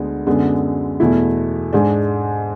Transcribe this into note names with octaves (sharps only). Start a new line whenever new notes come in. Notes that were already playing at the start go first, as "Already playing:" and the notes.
Already playing: D2 D3 G#3 B3
F#2 D3 G#3 B3
E2 B2 A3 E4
G#2 G#3 D4